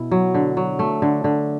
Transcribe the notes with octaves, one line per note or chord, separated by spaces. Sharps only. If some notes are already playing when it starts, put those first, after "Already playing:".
Already playing: B2 E4
F#3
D3
F#3
A3
D3
D3